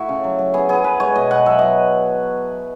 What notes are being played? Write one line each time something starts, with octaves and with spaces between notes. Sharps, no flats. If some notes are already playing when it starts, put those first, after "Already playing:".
Already playing: A3 E4 F#4
C#3
F#3
F#3
B3 G#4
B3 G#4
B3 B4
G#3 C#5
B2 D#5
B2 F#5
F#3 E5
F#3 D#5